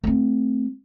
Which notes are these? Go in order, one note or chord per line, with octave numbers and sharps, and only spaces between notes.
A3 C4